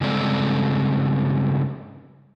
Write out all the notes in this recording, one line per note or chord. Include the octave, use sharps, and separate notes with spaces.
G2 C#3 G#3 C4 A4 D5